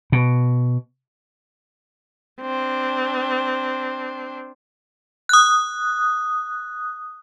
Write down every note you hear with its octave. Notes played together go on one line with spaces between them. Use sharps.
B2
C4 D4
D#6 F#6